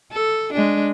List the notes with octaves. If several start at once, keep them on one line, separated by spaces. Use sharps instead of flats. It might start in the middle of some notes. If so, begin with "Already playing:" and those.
A4
G#3 D4